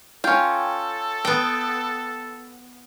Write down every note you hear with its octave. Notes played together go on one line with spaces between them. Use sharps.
C#4 F4 A4 G5
B3 G5 D#6